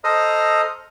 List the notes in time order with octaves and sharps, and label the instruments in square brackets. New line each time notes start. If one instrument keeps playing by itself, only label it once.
[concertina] A4 C5 D#5 A#5 D#6 F6